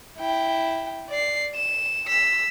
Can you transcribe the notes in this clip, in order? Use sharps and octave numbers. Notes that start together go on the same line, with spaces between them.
E4 G5
D5 C7
E7
E6 B6